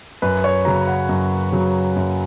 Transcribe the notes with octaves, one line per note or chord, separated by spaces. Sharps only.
F#2 B4
C#5
C#3 F#3 A#5
F#5
F#2
C#3 F#3
F#2